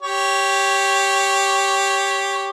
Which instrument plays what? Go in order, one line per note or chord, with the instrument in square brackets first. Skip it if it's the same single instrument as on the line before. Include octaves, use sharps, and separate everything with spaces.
[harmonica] G4 C#5